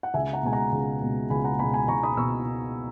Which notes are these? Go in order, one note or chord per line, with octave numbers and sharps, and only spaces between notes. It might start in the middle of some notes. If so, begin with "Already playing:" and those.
F#5
C#2 E5 G#5
F#5 A#5
B2 G#3 G#5
F#5 A#5
C#2
B2 G#3
C#2 G#5 B5
F#5 A#5
B2 G#3 G#5 B5
G#5 B5
C#2 A#5 C#6
B5 D#6
B2 C#6 E6